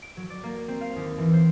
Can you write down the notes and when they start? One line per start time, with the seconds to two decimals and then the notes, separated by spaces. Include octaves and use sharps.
0.02 D7
0.17 F#3
0.30 D5
0.43 A#3
0.68 C4
0.81 F5
0.96 D#2
1.18 E3
1.33 C5